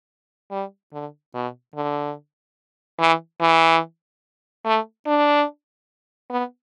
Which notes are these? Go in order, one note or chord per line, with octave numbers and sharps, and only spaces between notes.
G3
D3
B2
D3
E3
E3
A3
D4
B3